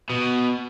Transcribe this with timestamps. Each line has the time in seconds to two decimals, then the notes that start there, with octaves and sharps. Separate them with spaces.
0.10 B2